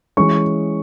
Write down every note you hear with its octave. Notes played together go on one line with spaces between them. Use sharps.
E3 G#3 C#4 C#6